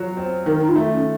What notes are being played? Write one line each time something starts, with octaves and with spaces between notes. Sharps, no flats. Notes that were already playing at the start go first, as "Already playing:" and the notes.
Already playing: F#3 F4
C4
D#3 A#4
D#4
F4
A3
C#4